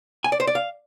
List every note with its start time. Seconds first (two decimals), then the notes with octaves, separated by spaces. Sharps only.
0.24 G#5
0.32 D5
0.40 C5
0.47 D5
0.55 F5